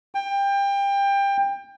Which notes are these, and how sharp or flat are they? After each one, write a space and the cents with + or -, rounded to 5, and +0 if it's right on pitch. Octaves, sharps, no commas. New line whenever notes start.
G5 +25